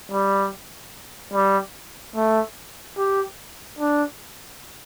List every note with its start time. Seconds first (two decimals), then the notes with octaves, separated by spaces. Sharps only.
0.12 G3
1.33 G3
2.16 A3
2.97 G4
3.79 D4